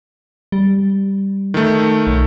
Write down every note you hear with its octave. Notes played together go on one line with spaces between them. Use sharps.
G3
D#3 A3
B1